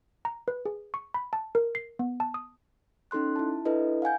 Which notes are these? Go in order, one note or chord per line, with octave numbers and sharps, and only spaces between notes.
A#5
B4
G#4
C#6
B5
A5
A#4
C7
B3
A5
D#6
C#4 D#4 A4 C6 F#6
E4 A5
D4 E4 A4 B4 D#5
F5 F#5 G#5 G6